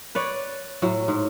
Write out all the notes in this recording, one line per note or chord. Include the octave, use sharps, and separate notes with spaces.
B4 C#5 D5
A2 F#3
G#2